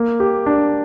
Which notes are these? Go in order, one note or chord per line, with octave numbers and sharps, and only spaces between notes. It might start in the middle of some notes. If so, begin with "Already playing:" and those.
Already playing: A#3
G4
D4